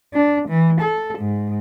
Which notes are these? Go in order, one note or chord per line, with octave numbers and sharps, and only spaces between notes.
D4
E3
A4
G#2